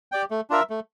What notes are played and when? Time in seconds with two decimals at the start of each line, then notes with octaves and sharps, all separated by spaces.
0.12 G4 D5 G5
0.31 A3
0.50 D4 F4 A#4 E5
0.70 A3